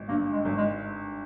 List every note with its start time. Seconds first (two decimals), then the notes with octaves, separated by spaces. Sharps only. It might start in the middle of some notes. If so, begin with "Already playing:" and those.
Already playing: G#1
0.08 G2 A#3
0.32 G#3
0.45 G#1
0.57 G#3